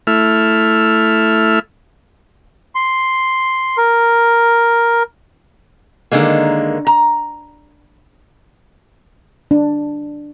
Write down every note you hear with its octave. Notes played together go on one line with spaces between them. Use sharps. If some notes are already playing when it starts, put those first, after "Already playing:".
A3 E4 F6
C6
A#4
D3 D#3 G#3 A#3
A#5
D4